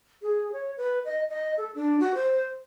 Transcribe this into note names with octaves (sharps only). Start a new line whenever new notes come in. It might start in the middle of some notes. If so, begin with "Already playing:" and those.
G#4
C#5
B4
D#5
D#5
A4
D4
F#4
C5